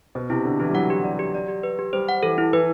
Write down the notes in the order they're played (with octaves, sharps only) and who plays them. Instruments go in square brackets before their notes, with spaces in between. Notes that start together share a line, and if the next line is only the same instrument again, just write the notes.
[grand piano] B2 [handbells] C5
[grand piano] C3 [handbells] E4
[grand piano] D3 [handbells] A4
[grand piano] E3 [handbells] E4
[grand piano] G3
[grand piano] F#3 [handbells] F#5
[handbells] G4
D5
G4
D5
G4
B4
G4
[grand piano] G3 [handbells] C5
[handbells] F#5
[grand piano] E3 [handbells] A4
[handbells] E4
[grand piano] E3 [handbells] B4